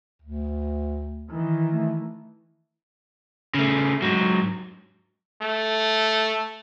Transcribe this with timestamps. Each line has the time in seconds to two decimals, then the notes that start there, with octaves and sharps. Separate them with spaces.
0.22 D2
1.31 D#3 E3
1.71 A3
3.54 C#3 A3
4.02 G#2 F#3
5.42 A3